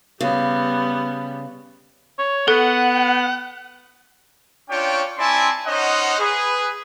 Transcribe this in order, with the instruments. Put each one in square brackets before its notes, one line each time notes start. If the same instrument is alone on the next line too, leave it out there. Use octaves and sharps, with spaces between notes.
[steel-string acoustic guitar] C#3 [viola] G3 B3
[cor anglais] C#5
[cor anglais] B3 [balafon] A4 [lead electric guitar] F#5
[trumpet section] C#4 D4 F4 C#5 G5
C4 E4 D5 G#5 A5 C6
C#4 D#4 C5 D#5 F#5
G#4 B4